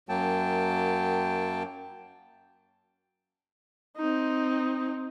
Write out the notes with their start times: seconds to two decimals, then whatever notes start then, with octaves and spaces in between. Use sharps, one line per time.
0.09 F#2 F#3 A#3 G5 A5
3.97 C4 D#4